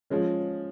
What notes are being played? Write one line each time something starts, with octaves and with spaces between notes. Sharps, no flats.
F3 G#3 C#4